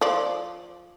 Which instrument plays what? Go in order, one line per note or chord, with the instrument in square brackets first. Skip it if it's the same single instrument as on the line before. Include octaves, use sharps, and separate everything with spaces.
[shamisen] F3 D5